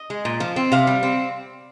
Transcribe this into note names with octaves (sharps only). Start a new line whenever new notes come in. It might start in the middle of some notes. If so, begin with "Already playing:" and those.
Already playing: D#5
G#3
A#2
F3
C4
C3 F5
G3
C4